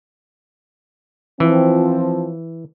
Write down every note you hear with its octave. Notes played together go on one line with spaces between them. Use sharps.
E3 F3 C4